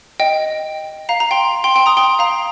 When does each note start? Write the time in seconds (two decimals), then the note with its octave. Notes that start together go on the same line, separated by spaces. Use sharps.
0.20 D#5 G5
1.09 F5 A#5
1.20 A#5
1.31 G5 C6
1.64 G5 C6
1.75 G5 C6
1.86 A#5 D#6
1.97 G5 C6
2.19 F5 A#5